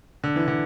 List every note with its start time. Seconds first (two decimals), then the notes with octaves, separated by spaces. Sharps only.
0.24 D3
0.36 E3
0.48 D3